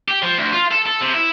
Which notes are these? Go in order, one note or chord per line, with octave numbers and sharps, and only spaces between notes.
G4
F3
D2
F4
A4
A4
C3
E4